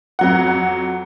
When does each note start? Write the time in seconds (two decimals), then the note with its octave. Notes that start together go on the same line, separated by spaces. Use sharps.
0.19 F2 F#3 F#5